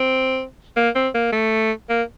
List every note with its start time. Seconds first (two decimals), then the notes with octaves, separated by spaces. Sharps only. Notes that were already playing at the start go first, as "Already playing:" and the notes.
Already playing: C4
0.76 A#3
0.95 C4
1.14 A#3
1.33 A3
1.90 A#3